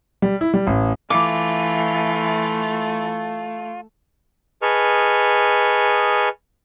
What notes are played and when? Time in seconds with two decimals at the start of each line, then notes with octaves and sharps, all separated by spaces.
0.22 G3
0.41 E4
0.54 G3
0.67 A1
1.10 E3 A3 F4 D6
4.62 G#4 B4 D#5 A5 C#6 F6